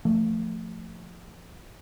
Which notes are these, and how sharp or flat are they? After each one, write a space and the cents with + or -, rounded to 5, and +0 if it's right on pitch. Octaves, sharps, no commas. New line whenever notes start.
F3 +0 A3 +20